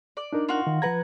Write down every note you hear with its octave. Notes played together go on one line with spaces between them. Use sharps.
D5
D4 D#4 A#4
F4 F#4
D#3
F3 B4 F#5 A#5 G#6